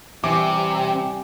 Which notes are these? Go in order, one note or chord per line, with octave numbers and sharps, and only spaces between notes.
C3 E3 G3 E4 G5 G#5 D6